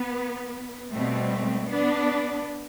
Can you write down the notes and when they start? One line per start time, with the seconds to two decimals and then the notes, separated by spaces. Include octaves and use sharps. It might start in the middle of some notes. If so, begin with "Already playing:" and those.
Already playing: B3
0.92 B2 G3 A3 C4
1.69 B3 D4